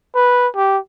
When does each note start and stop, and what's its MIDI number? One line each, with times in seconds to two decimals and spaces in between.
0.15 0.48 71
0.56 0.78 67